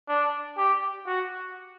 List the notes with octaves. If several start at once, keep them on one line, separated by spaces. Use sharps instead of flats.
D4
G4
F#4